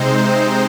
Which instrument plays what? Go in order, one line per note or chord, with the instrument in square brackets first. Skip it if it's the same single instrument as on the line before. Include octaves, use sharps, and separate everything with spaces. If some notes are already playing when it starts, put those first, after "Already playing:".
Already playing: [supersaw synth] C3 G#3 C4 D#4 C5